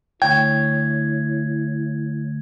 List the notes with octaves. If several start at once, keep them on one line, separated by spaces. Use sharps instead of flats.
D2 E4 C#5 G5 G#6